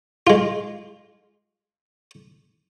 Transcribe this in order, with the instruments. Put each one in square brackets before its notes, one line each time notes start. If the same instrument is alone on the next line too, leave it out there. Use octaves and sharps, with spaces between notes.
[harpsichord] G#3 F4